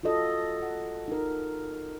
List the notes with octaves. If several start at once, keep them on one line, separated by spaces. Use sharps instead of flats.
F4 F#4 A4 D#5
F#5
D#4 A#4